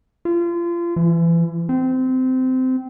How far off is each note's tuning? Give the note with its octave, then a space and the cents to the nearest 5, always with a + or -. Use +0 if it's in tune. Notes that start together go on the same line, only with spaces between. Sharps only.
F4 -30
E3 +30
C4 -20